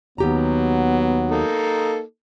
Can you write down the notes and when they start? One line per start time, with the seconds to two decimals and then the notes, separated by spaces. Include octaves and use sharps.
0.18 D#2 F#3 B3 G4 A#5
1.30 A#3 D#4 A4